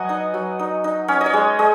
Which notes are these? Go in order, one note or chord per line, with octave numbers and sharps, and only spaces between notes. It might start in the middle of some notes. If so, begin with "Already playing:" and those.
Already playing: F#3 B3 D#5 F#5 G#5
D#4
F#3
D#4
D#4
C#4 C#5
D#5
C#5
G#3
G#3 D#5